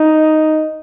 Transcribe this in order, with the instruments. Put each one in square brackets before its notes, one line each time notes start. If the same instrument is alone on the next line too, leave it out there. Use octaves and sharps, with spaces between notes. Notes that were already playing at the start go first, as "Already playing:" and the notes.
Already playing: [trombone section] D#4